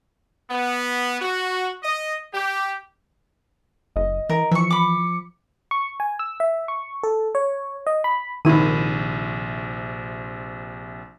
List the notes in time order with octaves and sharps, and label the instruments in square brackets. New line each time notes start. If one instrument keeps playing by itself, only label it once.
[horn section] B3
F#4
D#5
G4
[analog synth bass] F#1 [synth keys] D#5
[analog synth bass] E3 [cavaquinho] A#4
[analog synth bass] E3 [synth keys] F3 C#7 [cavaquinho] E5 C#6
[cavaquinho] B5 D6
[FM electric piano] C#6
G#5
E6
E5
C#6
A4
C#5
D#5
B5
[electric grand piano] A#1 C3 D#7 [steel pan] D#3 E4